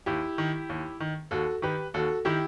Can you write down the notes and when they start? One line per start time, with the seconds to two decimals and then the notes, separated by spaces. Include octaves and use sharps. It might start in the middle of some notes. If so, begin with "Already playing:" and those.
0.06 D#2 E4 G4
0.38 D#3
0.69 D#2
1.00 D#3
1.31 D#2 F#4 A4
1.62 D#3 G4 B4
1.94 D#2 F#4 A4
2.25 D#3 E4 G4